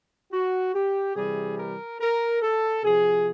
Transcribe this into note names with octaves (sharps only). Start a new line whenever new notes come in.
F#4
G4
C3 E3 G3 G#4
A#4
A#4
A4
C3 F3 G#4